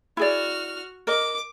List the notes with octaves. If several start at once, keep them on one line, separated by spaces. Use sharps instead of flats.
E4 F#4 G#4 D5 F6
A#4 D#5 D6